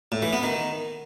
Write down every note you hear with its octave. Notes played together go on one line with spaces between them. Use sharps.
A2
E3
B3
D#3